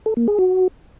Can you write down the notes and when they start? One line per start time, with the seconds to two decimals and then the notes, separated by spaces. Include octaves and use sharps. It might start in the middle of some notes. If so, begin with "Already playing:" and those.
0.06 A4
0.17 A#3
0.28 G#4
0.39 F#4